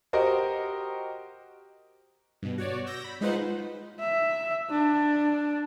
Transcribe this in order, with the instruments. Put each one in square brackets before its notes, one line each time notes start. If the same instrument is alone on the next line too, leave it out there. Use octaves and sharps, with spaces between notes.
[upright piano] F#4 G4 A#4 C5 D#5
[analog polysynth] G2 B2
F#4 C#5 D5
E6 G6 A#6
B5
G#3 D#4 F4 B4 C5 F#5
[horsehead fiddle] E5
D4